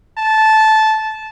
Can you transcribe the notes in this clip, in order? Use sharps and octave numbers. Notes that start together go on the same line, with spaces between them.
A5